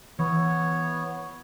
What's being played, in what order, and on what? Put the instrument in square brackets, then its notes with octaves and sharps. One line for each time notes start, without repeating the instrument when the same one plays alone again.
[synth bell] E3 [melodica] B3 C#5